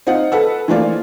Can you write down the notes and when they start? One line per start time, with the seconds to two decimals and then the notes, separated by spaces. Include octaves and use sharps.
0.07 C4 D#4 F4 F#5
0.32 A4 B4 F#5 E6
0.68 E3 F3 A3 A#3 D4 F4